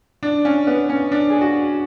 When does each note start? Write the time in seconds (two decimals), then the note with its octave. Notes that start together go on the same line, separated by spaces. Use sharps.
0.23 D4
0.45 C#4
0.67 B3
0.90 C#4
1.12 D4
1.30 G#4
1.41 F#4